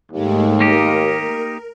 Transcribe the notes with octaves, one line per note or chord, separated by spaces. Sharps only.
D#2 G#2 G#3 A3
A#3 D#4 G4 A#4